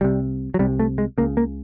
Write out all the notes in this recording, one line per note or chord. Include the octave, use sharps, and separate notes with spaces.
C2 C3 G3
F#3
C2 C3 G3
A3
G#3
C#2 C#3 A#3
A#3